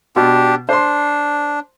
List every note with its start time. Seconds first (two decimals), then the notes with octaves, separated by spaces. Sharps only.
0.16 B2 D4 G4
0.69 D4 C5 C6